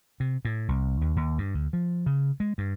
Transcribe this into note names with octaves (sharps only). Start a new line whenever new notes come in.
C3
A2
C2
D#2
D#2
G2
D2
F3
C#3
G#3
G2